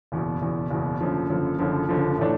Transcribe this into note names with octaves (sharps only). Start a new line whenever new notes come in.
F#1 E2 B2
F#1 E2 B2
F#1 E2 B2
F#1 F#2 D3 F3
F#1 F#2 D3 F3
F#1 F#2 D3 F3
F#1 F#2 D3 F3
A2 E3 A3 D4